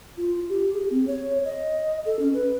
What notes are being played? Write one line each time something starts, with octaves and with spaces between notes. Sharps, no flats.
F4
G4
G#4
C4
C#5
D#5
A4
C#4
B4